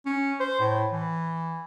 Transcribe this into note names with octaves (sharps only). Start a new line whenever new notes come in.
C#4
C5
A2
E3